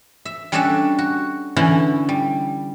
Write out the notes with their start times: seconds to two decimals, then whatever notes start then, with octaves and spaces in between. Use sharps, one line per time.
0.25 E5
0.52 G3 C#4 D4 F#4 A4 E5
0.99 F#4
1.56 D3 E3 C#4 E4
2.09 G3